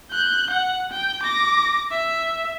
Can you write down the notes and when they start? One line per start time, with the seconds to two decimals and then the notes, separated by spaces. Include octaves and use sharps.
0.11 F#6 G6
0.51 F#5
0.92 G5
1.23 D6 A#6
1.91 E5